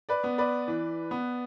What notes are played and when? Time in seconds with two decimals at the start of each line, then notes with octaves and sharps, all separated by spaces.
0.09 B4 D5
0.24 B3
0.38 B4 D5
0.68 E3
1.11 B3